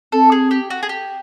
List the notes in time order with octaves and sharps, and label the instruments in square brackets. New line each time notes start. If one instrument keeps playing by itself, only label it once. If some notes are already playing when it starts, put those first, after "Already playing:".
[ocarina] C4 [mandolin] A4
[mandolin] G#4
G4
F#4
G#4
G4